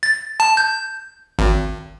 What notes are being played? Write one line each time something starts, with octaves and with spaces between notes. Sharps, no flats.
A6
A5
G6
G#1